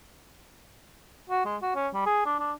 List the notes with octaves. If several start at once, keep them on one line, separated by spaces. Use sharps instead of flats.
F#4
G#3
F#4
C#4
G3
G#4
D4
D4